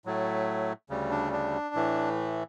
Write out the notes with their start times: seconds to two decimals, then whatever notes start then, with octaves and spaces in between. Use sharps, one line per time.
0.05 A2 F#3 A3
0.90 D2 C#3 G3
1.11 D4
1.33 D4
1.75 A2 E3 A3